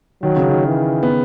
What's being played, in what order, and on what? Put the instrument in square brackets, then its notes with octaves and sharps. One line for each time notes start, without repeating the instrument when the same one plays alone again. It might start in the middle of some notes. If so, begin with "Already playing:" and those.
[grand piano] D#3 [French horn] F#3
[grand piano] C#3
D#3
[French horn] E3
[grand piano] B3